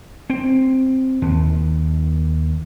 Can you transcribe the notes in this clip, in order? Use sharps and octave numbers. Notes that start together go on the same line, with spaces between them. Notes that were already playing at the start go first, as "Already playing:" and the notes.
C4
D#2